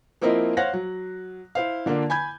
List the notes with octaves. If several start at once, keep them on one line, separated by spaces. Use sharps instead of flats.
F3 A#3 C4 E4 A#4 D#5
C5 C#5 F5 F#5 F#6 A#6
F#3
E4 C5 F5
D3 A#3 D4 F4
G#5 B5 G6 G#6